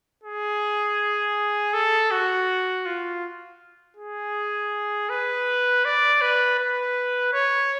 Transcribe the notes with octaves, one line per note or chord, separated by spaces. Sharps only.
G#4
A4
F#4
F4
G#4
B4
D5
B4
B4
C#5